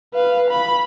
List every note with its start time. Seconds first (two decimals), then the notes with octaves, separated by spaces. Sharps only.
0.14 B4 F5
0.50 B5